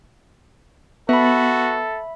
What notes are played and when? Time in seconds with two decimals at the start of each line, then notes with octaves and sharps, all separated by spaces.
1.09 B3 F#4 A4 E5 B5